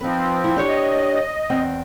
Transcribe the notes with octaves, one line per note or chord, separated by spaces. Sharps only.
F3 C4 D#4 B4
E4
D4 G4 C#5
D#5
E2 C4 G5